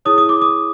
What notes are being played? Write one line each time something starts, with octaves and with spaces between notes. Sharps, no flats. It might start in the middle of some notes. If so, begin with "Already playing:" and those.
E4 G#4 C#5 D#6
D#6
D6
D#6